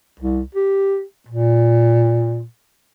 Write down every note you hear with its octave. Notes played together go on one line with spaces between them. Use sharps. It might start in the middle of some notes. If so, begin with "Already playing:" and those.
C2
G4
A#2